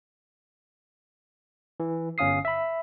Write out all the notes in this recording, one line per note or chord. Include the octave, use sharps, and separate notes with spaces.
E3
G1 C#4 F5 D#6 C7
E5 B5